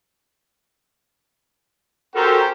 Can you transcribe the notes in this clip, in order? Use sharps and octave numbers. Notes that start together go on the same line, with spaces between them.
C#4 F#4 G4 A4 A#4 C5